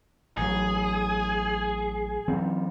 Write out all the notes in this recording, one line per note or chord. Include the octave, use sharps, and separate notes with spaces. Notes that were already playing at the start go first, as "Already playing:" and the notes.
A1 F#3 G#4
E3 F#3 C4